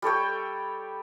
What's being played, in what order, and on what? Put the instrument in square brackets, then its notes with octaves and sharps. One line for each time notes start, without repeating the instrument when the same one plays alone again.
[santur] G3 A4 C#5 G5